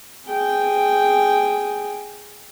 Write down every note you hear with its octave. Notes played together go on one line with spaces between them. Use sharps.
G#4 G5